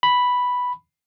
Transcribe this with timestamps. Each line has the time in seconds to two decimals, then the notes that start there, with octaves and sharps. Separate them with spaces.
0.03 B5